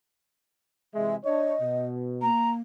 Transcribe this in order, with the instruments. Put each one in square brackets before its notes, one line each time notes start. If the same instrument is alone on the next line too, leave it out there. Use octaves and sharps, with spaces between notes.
[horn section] C3 E3 G#3 [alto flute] E5
[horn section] D4 C#5 [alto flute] D#5
[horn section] B2
[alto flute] A#3 [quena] A#5